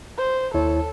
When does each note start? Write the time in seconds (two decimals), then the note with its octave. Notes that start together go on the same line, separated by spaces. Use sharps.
0.18 C5
0.54 D#2 E4 A4 C#5